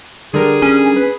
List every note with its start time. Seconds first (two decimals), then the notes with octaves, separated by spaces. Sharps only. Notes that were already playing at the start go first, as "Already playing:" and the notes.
0.34 D3 G3 G#4 A#4
0.62 C#4
0.96 B4